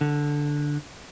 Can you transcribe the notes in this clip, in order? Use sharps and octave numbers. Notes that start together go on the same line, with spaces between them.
D3